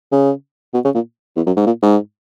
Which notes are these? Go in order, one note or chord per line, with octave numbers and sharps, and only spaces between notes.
C#3
B2
C#3
A#2
E2
F#2
G#2
A#2
G#2